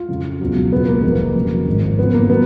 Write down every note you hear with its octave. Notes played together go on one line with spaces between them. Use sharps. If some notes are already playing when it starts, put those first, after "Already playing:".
Already playing: F4
F2 C#3 F3
C#2 B2 F#3
C#2 B2 F#3 B3
A#3
F1 F2 D#3 A#3
F2 C#3 F#3
G#1 G#2 D#3
F2 C#3 F3 B3
A#3
F#3 B3